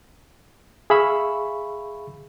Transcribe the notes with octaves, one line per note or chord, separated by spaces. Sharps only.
G#4 E5 F5 B5 C#6 E6